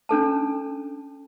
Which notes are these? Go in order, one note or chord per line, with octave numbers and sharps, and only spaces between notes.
C#4 D4 A4 A5